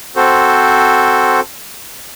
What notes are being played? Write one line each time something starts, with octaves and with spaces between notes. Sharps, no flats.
C4 F#4 A4 C5